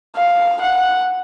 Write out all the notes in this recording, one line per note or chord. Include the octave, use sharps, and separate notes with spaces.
F5
F#5